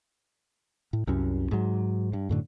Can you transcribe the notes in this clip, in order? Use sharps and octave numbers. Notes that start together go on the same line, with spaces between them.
A2
C2 F#2 C#4
G#2 F#3
G2
F#2 A2 D3